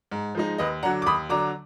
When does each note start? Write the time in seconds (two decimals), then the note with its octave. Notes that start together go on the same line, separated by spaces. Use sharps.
0.12 G#2
0.35 F3 G#3 D#4
0.58 D#2 B4 D#5
0.83 D3 F#3 D4 F#5 A#5
1.02 D6
1.06 D#2 B5 D#6
1.29 D3 F#3 D4 A#5 D6